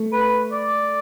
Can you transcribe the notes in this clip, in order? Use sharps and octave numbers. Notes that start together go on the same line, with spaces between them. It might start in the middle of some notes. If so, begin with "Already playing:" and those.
Already playing: A3
B4
D5